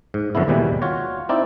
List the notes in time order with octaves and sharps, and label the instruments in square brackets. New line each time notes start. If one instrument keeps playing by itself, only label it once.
[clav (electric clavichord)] G#2
F#2 D3 F3 B3 E4
D#2 G#2 B2 E3 G3
F4 F#4 C#5
C4 D#4 E4 D5